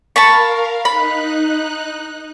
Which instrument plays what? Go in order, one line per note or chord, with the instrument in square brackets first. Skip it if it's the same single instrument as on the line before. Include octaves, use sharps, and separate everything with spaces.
[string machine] A#4 F5 [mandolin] A5 B5 C#6
[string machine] D#4 F#6 [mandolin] B5